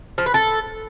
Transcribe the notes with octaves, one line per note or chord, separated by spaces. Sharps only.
F3
B4
A4